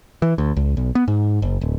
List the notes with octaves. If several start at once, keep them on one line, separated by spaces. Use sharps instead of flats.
E3
D2
C#2
B1
B3
G#2
F#1
D1